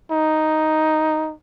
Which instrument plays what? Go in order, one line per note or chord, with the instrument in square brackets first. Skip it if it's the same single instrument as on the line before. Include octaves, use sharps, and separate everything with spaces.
[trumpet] D#4